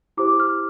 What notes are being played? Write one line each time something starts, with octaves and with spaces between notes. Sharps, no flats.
E4 G4 C5 D6
F6